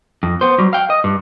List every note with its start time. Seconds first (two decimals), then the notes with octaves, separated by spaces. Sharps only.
0.23 F2
0.41 B3 C5
0.58 F#3 G3
0.73 F5 G5
0.90 D#5
1.04 G2